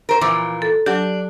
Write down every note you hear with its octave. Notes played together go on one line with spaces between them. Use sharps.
A#4 C5
A#2 E3 F3 D6
A4
F#3 D4 G4